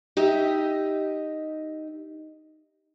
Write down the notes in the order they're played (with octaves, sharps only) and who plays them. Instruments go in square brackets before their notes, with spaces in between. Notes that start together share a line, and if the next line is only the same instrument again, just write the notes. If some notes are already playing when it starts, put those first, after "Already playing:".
[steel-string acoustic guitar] D#4 G4 D#5 E5